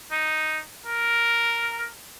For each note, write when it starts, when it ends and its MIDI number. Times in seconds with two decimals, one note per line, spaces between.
0.12 0.59 63
0.86 1.87 70